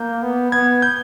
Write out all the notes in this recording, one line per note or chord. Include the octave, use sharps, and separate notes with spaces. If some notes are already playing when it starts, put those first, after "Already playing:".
Already playing: A#3 G6
B3
B3 G#6
G6